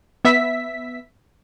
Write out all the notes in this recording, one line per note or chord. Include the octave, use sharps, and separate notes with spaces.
B3 E5 B6